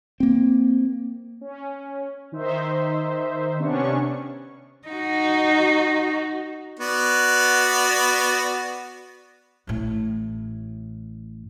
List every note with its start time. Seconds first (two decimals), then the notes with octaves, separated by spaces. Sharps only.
0.20 A#3 C4
1.41 C#4
2.32 D#3 D#4 C5 E5
3.58 C3 B3 C#4 D4 C#6
4.88 D#4 F#4
6.79 B3 F#4 D5
9.67 A1 A2